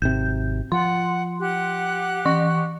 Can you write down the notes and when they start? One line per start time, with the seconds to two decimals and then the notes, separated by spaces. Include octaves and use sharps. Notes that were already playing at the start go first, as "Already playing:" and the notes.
0.02 G#1 C3 G6
0.72 F3 F#5 C6
1.40 G4 F#5 F#6
2.25 E3 C#6